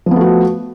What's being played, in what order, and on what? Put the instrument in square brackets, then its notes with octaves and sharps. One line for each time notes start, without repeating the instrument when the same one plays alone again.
[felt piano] F3
B3
A3
F#4